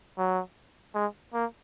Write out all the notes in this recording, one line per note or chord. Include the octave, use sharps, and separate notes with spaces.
F#3
G#3
A#3